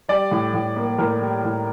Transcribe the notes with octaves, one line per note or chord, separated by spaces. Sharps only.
G3 D5
A2
A2
A#3
A2 A#4
G3
A2